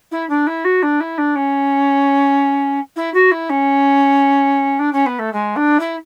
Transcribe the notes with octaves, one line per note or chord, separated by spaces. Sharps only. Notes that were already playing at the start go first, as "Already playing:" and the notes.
E4
D4
E4
F#4
D4
E4
D4
C#4
E4
F#4
E4
C#4
D4
C#4
B3
A3
G#3
D4
E4